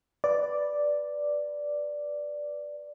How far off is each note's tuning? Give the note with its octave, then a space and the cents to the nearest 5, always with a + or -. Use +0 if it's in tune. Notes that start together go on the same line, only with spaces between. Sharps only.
B4 +0 D5 +0